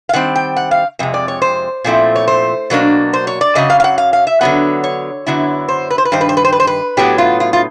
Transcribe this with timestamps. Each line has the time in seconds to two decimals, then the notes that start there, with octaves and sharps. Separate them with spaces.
0.09 F5
0.13 D#3 G3 C4 F#5
0.35 G5
0.56 F#5
0.71 F5
0.99 F2 C3 G#3
1.14 D5
1.28 C#5
1.42 C5
1.84 A#2 F3 A3 C4 E4
2.16 C#5
2.27 C5
2.70 B2 F#3 A#3 D4
3.13 C5
3.27 C#5
3.41 D5
3.55 F#2 C#3 F#3 D#5
3.70 F5
3.80 F5
3.84 F#5
3.98 F5
4.13 F5
4.27 E5
4.41 D3 F#3 B3 F#5
4.84 C#5
5.27 F#2 D3 F#3 B3 E4
5.69 C5
5.90 B4
5.98 C5
6.05 B4
6.12 G2 D#3 C5
6.21 B4
6.29 C5
6.37 B4
6.45 C5
6.52 B4
6.60 C5
6.67 B4
6.97 A2 F#3 B3 G4
7.18 F4
7.40 F4
7.53 F4